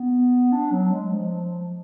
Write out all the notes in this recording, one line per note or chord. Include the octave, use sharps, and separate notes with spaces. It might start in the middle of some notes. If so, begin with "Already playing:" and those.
Already playing: B3
D4
F#3
G#3
F3